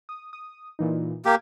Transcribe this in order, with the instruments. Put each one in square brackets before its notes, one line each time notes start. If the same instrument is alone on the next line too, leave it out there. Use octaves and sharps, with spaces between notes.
[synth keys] D#6
D#6
A#2 E3 D#4
[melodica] A#3 G4 [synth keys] D6 G#6